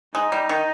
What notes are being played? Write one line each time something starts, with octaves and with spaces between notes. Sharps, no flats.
G#3 D#4
G3
D#3